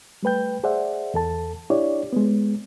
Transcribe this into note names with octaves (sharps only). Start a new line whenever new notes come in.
G3 A3 B4 G5 G6
G#4 C5 D5 E5 F#5
E2 A4 A5
D4 E4 G4 C#5 D5
G#3 B3